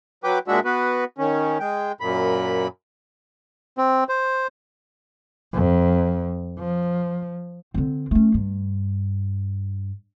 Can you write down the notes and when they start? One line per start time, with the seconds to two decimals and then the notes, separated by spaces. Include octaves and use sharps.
0.24 F#3 B4 G5 D6
0.48 A#2 G#3 D4 F#4 E5
0.65 B3 F#4 B4
1.18 D#3 C#4
1.60 G#3 G5
2.01 F#2 A#2 B5
3.78 C4
4.09 C5
5.53 F2
6.59 F3
7.74 D3 C4
8.11 A3 C#4
8.34 G2